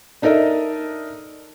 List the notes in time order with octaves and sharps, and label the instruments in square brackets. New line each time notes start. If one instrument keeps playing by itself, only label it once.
[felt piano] D4 D#4 A4 A#4 D#5 E5